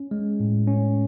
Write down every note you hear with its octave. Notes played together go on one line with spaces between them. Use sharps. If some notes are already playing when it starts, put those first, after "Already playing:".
Already playing: C#4
G#3
A2
C#4